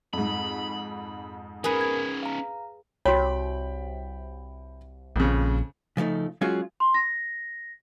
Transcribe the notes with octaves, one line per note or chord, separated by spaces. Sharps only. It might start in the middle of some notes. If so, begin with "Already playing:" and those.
F2 G#2 B5
C#4 D#4 G#4 A#4 B4
G#6
F5 A#5
C2 F#4 C#5 G5 B5
A#1 F2 C#3
C#3 F3 A3 D#4
F#3 G#3 C#4 F4 F#4 G#4
C6
A#6